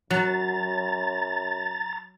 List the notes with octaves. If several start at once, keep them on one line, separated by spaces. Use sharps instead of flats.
F#2 F#3 A#5 A6